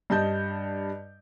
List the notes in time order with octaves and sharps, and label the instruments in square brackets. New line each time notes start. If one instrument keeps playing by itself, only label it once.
[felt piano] G2 D#5 A5 G6